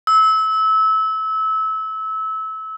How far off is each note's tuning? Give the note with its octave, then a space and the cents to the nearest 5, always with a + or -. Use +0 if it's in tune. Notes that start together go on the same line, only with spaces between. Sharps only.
E6 -25